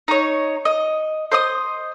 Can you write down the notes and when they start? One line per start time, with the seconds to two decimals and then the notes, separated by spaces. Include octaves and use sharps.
0.08 D#4 C#5
0.65 D#5
1.32 C5 D#5 D#6